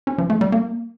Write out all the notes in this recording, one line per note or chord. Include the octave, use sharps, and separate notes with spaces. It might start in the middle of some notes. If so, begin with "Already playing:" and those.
C#4
F3
A3
G3
A#3